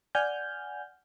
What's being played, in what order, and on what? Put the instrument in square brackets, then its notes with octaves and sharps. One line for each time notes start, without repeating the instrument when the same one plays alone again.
[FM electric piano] D5 F#5 G#5 F6 G6